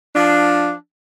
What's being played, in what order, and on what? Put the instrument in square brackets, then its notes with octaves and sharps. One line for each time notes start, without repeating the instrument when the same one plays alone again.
[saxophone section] F3 D4